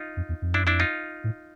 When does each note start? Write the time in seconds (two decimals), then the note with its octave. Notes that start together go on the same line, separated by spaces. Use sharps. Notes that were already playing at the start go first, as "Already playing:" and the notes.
Already playing: D#4 F4
0.17 F2
0.29 E2
0.42 F2
0.53 F#2 D4 E4
0.64 F2 D4 E4
0.80 D#4 F4
1.24 A2